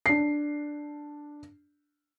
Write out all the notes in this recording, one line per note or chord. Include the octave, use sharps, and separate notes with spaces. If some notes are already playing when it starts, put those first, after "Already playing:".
D4 C7